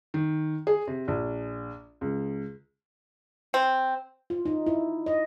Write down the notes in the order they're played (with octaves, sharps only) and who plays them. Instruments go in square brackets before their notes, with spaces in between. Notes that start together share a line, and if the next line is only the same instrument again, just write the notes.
[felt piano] D#3
G#4
C3
A#1
C#2
[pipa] C4
[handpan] F4
D#4
E4
D#5